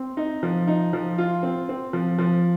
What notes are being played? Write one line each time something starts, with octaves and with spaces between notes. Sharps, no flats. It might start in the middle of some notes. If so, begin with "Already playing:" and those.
Already playing: C4
D#4
F3
D#4
F3
F4
C4
C4
F3
F3